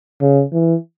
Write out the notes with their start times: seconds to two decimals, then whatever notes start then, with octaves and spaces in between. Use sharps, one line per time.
0.21 C#3
0.52 E3